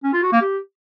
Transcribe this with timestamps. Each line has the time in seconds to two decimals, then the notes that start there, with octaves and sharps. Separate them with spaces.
0.04 C#4
0.13 F4
0.23 F#4
0.32 A#3
0.42 G4